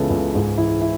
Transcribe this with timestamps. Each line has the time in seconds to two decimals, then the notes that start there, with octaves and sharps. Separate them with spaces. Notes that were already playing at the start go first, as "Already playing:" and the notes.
Already playing: C#2 C#3 E3 B3 C#4 G#4 A4
0.10 C#2
0.34 G#2 G#4
0.57 E3 E4
0.81 E4